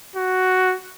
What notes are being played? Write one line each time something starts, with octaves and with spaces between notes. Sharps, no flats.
F#4